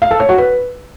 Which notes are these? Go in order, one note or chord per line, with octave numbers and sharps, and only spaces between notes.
F5
A4
C#5
F#4
B4